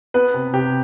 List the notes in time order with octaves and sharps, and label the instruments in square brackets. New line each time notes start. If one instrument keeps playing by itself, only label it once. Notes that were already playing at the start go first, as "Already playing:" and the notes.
[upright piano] B3 B4
C3
C3 G4